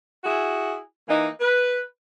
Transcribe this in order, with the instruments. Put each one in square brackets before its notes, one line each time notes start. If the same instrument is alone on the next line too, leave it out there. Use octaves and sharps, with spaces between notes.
[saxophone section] E4 F#4 G#4
E3 A#3 D#4
B4